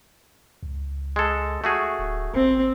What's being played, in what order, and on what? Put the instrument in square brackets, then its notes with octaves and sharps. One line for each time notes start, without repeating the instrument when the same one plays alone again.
[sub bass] C#2
[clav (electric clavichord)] G#3 A4
A3 F#4 G#4
[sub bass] D1
[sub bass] A1 [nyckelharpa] C4